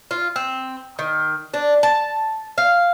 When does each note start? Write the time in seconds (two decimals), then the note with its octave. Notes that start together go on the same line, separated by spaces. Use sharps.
0.11 F4
0.36 C4
0.99 D#3
1.54 D4
1.83 A5
2.58 F5